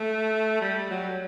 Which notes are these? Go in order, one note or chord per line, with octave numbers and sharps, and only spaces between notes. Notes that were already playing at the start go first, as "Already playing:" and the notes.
Already playing: A3
G3
F#3